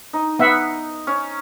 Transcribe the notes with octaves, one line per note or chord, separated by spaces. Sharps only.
D#4
B3 E5 F#5
C#4